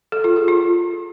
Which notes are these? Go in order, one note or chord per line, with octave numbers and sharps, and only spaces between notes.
A4
F4
G#4
F4